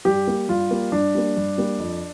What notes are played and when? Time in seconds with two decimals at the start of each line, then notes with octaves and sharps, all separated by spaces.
0.05 G2 G4
0.27 G3 A#3
0.48 G2 F4
0.71 G3 A#3
0.92 G2 D4
1.15 G3 A#3
1.37 G2
1.58 G3 A#3
1.80 F2